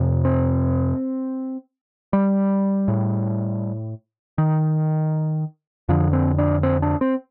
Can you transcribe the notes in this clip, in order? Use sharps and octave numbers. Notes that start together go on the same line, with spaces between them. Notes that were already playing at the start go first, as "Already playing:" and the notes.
Already playing: F2 C3
C4
G3
A2
D#3
F2 D3 F3
C4
D4
C4
D4
C4